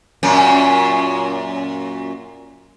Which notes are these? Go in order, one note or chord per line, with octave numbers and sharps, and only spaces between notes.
F#2 A#2 C#4